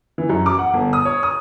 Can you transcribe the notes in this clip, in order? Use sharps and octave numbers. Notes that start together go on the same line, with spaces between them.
E3
F#2
D6
F#5
G1
D#6
C#5
D#6